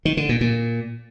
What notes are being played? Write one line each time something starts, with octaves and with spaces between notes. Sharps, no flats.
D#3
D3
A#2
A#2